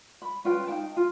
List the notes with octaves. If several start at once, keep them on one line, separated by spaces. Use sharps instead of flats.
B5
C#4 F4 B4 G5
D#4 F5 G5 A5
F4